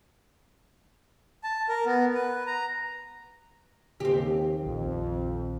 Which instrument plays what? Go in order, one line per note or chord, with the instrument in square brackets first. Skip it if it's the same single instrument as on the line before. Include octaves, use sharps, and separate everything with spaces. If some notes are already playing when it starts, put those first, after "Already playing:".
[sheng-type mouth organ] A5
A#4
B3
B4
A#5
[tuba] D#2 [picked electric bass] C#3 [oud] C4 G4
[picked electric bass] A#1 D#3 [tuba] F2